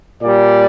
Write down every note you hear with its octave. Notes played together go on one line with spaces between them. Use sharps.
A#2 G3 D5